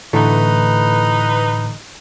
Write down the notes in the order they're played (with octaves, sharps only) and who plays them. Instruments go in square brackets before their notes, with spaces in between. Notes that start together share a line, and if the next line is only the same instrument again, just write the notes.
[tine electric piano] A2 [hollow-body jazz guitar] D3 E3 A3 [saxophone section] D#4 B4